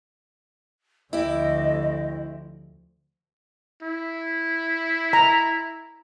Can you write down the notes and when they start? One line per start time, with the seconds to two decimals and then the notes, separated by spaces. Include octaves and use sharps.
1.13 D2 F3 E4 G4 D#5
3.82 E4
5.13 A#5